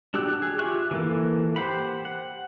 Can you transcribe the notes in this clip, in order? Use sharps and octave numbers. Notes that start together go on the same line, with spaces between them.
D4 F#4 G4 E6 F#6
G#4
F4 G4 E5 C#6 F#6
E3 A#3 A4
G4 C5 F#5 B5
F#5